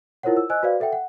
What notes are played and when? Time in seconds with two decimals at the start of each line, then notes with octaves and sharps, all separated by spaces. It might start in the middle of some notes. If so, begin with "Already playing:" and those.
0.23 E4 F4 A#4 C5 C#5 F#5
0.37 E6
0.50 C5 D#5 G#5 E6 F#6
0.63 F#4 B4 C5 D5 F5
0.80 A4 E5 F#5 G5
0.93 F#5